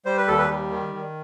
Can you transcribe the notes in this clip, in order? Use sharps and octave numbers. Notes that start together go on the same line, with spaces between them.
G3 C5
B4
D#2 A4
B4
G3
D#3
D#3